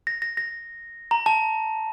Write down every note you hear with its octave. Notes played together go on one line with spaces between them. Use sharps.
A#6
A#6
A#6
A#5
A5